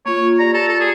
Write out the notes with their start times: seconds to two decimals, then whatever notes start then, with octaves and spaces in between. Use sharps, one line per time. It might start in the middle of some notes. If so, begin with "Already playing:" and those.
0.06 A#3 F4 C#5
0.39 G4 D5 A#5
0.54 A4
0.69 A4
0.80 G#4